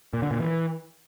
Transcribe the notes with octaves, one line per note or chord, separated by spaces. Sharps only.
A#2
D3
A#2
E3